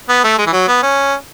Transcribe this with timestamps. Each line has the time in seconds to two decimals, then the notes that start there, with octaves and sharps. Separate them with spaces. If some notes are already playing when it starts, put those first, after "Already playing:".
0.09 B3
0.24 A3
0.38 G#3
0.47 E3
0.53 F#3
0.68 B3
0.83 C#4